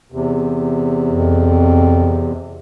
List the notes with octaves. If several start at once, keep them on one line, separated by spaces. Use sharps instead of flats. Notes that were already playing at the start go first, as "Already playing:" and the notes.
E2 C3
F2